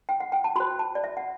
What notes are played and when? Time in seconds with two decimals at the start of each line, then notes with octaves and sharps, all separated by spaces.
0.09 G5
0.20 F#5
0.32 G5
0.44 A5
0.56 F#4 B5
0.60 C5
0.79 A5
0.95 D5
1.04 E5
1.17 F#5